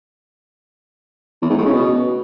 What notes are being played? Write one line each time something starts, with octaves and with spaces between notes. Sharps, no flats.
E2
G#2
A2
C#3
B2